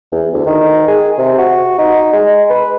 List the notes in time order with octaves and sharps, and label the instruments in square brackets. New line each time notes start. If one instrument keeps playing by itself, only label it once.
[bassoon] E2
D2
D#3
G#4
C3
F#4
D#4
G#3
B4